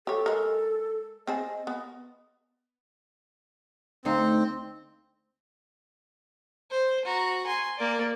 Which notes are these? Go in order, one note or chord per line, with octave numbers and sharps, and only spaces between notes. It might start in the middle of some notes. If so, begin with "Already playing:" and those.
G4 A4 C#5
G#3 A#4
C4 G#4 D#5 A5
B3
D2 C4 D#4 F5
C5
F#4 A#5
G#5 C6
A#3 D5